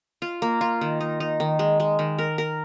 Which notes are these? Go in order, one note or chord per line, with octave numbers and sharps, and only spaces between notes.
F4
A#3
F4
D#3
D#4
D#4
D#3
G#3
G#3
D#3
A#4
A#4